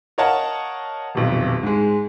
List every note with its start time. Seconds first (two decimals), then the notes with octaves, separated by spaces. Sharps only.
0.18 A#4 C#5 D#5 F5 F#5 A5
1.15 D#1 B1 F2
1.63 G#2 G#3